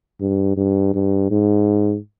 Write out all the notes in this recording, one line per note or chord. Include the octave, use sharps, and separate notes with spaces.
G2
G2
G2
G#2